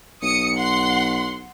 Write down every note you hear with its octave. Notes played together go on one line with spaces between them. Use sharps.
B1 D#6 C#7
F#5 C6